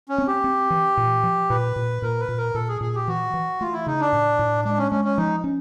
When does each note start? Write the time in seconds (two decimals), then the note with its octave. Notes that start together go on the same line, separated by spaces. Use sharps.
0.09 C#4
0.18 C4
0.27 G4
0.44 C4
0.70 E3
0.97 A#2
1.23 F3
1.50 A#2 B4
1.76 A#2
2.02 A#2 A#4
2.20 B4
2.28 A#2
2.37 A#4
2.54 A#2 A4
2.68 G#4
2.81 A#2 G#4
2.95 G4
3.08 E3 F#4
3.34 E3
3.61 A3 F4
3.73 E4
3.86 C#3 D#4
4.00 D4
4.13 A2
4.39 A2
4.65 G#3 D4
4.78 C#4
4.91 G#3 C#4
5.04 C#4
5.17 F3 D#4
5.44 C#4